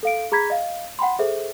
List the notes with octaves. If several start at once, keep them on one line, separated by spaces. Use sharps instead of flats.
A4 F5 D7
G#4 A#5 B5 G#6 B6
D#5 F5
F#5 G5 B5 C6
G#4 A4 C5 E5